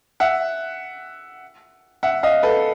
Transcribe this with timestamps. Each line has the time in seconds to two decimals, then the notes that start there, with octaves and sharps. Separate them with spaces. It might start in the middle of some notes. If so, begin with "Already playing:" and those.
0.20 E5 F#5
2.03 E5 F#5
2.23 D#5 F5
2.43 A4 B4